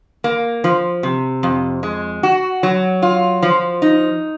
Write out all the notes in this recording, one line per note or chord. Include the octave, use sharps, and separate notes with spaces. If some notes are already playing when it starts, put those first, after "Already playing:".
A#3
F3
C3
F2
G#3
F#4
F#3
F4
F3
D#4